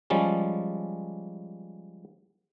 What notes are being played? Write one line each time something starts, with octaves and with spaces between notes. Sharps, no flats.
F3 G3 G#3 C#4